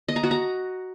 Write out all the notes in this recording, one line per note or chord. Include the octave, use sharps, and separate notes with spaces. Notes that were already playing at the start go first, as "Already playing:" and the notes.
D#5
A#5
F#4
A#5